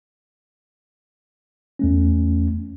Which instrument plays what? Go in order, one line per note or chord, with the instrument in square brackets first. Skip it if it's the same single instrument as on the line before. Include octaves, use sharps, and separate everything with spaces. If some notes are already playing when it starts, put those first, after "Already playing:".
[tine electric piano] E2 A3 C#4